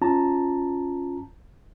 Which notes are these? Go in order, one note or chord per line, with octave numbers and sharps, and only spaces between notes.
C#4 F4 A5 A#5